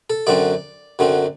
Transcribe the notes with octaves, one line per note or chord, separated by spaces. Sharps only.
A4
F#2 D3 F#3 C4 D5
F#2 D3 F#3 C4